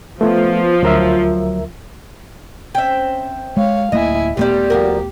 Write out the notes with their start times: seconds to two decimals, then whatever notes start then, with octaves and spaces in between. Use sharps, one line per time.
0.21 F3 A3 B3 F4 B4
0.83 D2 F#3 A#4 E5
2.75 C4 C#4 E5 G5
3.57 G#3 C#5 F5
3.92 D1 A3 A#3 E4 D#5 G#5
4.37 D#1 A#2 D3 G3 A3 B3 G4
4.70 F3 F#4 A#4